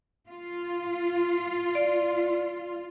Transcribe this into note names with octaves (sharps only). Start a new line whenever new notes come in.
F4
D5